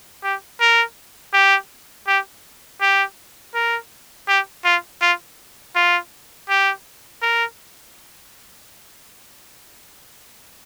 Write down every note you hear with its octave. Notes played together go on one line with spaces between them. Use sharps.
G4
A#4
G4
G4
G4
A#4
G4
F4
F4
F4
G4
A#4